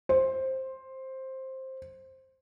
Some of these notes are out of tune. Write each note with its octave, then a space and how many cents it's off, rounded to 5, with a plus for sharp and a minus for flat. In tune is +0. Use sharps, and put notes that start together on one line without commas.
C5 +10